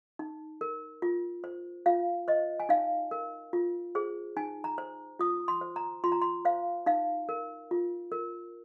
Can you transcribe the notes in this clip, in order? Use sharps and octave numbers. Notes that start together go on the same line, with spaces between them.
D#4
A#4
F4
C5
F4 F5
C5 D#5
G#5
D#4 F5
A#4
F4
G#4 C5
D#4 G#5
A#5
C5
F4 D#6
C6
C5
A#5
F4 C6
A#5
C6
C5 F5
D#4 F5
A#4
F4
A#4